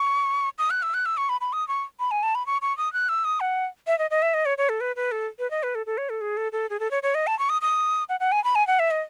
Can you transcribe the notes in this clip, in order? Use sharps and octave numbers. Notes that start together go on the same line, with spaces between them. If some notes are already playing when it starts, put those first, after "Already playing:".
Already playing: C#6
D#6
F#6
E6
F#6
E6
C#6
B5
B5
D#6
C#6
B5
G#5
A5
B5
C#6
C#6
D#6
F#6
E6
D#6
F#5
E5
D#5
D#5
E5
D#5
C#5
C#5
A4
B4
B4
A4
B4
D#5
B4
A4
A4
C#5
A4
G#4
A4
A4
G#4
A4
C#5
C#5
D#5
A5
C#6
D#6
D#6
F#5
F#5
G#5
B5
G#5
F#5
E5
D#5